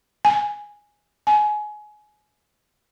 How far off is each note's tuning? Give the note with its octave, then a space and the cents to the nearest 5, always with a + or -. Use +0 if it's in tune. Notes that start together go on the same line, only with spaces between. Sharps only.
G#5 -5
G#5 +20